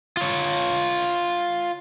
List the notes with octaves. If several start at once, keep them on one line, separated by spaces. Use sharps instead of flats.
F4 C#5